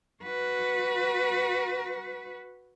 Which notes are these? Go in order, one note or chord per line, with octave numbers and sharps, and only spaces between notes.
F#4 B4